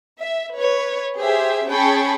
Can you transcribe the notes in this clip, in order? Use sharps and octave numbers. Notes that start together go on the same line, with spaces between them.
E5
B4 C#5
G4 G#4 C5 E5
C#4 G#4 G5 A5 B5 C#6